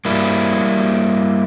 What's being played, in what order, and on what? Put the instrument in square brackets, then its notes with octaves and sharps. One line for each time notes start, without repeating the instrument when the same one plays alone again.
[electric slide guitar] G3 A#3 E4